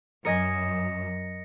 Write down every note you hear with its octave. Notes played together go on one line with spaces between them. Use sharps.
F#2 A#4 D#5 G#5 A#6 C#7